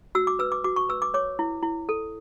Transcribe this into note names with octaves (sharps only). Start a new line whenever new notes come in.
F#4 E6
D6
B4 E6
D6
F#4 D6
C#6
B4 E6
D6
C#5 D6
E4
E4
A4